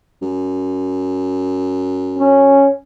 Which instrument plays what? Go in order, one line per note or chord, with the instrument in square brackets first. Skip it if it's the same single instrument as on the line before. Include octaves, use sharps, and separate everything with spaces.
[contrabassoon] F#2
[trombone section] C#4